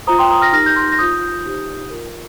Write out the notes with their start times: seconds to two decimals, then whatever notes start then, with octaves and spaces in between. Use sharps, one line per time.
0.07 F4 C5 A#5 D#6
0.19 G5 C6
0.30 A#5 D#6
0.41 F6 A#6
0.53 D#4 G4 A#4 F6 A#6
0.66 G6
0.76 C6 F6
0.92 A#6
0.99 F4 C5 D#6 G6
1.44 D#4 G4 C5
1.90 F4 A#4